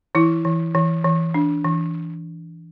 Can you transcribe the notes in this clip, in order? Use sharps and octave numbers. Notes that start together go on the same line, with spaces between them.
E3 E4
E3
E3
E3
D4
E3